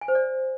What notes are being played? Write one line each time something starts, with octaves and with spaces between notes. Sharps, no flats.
G#5
C5
D5